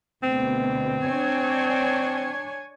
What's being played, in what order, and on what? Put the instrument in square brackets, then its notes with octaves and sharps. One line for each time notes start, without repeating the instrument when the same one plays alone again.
[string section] D2 B2 [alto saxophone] C4
[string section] D4 C#5 G#5